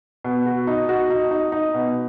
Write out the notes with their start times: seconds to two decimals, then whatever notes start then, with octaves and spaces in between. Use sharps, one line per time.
0.25 B2
0.46 F#4
0.67 D#4
0.89 F#4
1.10 D#4
1.31 D#4
1.52 D#4
1.74 B2